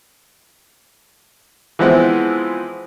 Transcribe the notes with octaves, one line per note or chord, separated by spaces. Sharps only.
E3 F3 G#3 B3 C4 E4